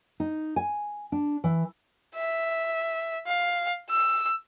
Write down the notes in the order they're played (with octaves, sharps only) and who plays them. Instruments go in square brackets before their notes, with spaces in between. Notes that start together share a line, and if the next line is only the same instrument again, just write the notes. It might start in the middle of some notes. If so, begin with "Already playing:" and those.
[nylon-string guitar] D#4
G#5
D4
E3
[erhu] E5
F5
E6